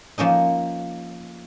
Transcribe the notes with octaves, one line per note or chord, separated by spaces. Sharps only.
F3 A#3 C#4 D#4